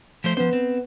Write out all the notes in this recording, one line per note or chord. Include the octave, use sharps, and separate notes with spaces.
F3 A3 C5
F3 B3 C5
C4